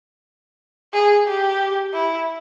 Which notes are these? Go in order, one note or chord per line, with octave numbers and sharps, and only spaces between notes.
G#4
G4
E4